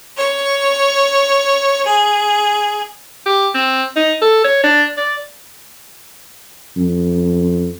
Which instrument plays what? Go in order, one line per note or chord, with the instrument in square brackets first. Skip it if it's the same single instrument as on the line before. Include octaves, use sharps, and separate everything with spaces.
[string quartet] C#5
G#4
[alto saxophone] G4
C4
D#4
A4
C#5
D4
D5
[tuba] F2